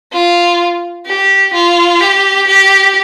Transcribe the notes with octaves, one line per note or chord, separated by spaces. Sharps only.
F4
G4
F4
G4
G4